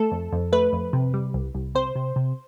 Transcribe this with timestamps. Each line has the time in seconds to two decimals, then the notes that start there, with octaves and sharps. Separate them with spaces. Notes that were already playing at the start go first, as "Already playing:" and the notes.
Already playing: A3 A4
0.12 F2
0.32 F2
0.52 A3 B4
0.73 F2
0.93 C3
1.14 G3
1.34 C2
1.55 C2
1.75 C3 C5
1.95 C3
2.16 C3